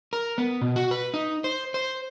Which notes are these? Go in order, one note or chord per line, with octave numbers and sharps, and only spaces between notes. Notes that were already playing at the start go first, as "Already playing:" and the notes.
A#4
B3
B2
F#4
B4
D#4
C5
C5